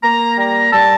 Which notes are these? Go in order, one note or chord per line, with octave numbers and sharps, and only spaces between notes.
A#3 A#5
G3 A#5
G3 A5